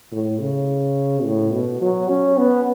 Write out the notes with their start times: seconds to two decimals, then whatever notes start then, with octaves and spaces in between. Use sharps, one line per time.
0.12 A2
0.40 C#3
1.24 A2
1.53 B2
1.81 F#3
2.09 C#4
2.38 B3